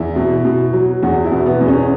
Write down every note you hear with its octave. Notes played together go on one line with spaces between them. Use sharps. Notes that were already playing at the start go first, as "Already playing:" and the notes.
Already playing: E2 E4
B2
B2
F#3
E2 F#4
E4
B2
B3
E2
C#4